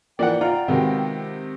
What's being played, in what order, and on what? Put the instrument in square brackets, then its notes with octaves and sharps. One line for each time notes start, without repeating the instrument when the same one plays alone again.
[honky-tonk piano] E3 F3 A#3 [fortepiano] D5 F#5 [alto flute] G5
[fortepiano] F4 [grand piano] D5 F#5 [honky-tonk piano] A#5
[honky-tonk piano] C3 D#3 G#3 [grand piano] B3 F#4